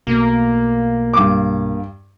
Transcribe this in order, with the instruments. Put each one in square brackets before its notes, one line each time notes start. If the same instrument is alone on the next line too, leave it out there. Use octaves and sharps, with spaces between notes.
[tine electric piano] B1 B2 A3 [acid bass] A#3
[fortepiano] G2 D6